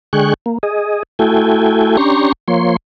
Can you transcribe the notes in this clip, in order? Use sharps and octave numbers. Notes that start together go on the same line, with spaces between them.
D3 G#3 G#4 G5 C#6 F#6
A#3
G#4 D#5
A3 E4 F#4 A4 G5 G#5
C#4 D4 G4 A#5 C6 C#6
F3 A#3 C#5 C6